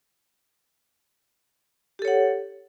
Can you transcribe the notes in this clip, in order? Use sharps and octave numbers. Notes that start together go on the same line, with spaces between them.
G4 A4 C#5 F#5